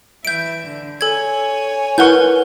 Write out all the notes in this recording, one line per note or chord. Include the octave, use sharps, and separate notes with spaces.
E3 E5 G6 D7
D3
A4 C#5 G#5 G#6
E4 A#4 B4 F#5 C#6 G6